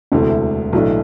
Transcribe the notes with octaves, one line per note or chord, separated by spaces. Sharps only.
E1 D2 C3 E3 A3
B1 A2 E3 A3 D4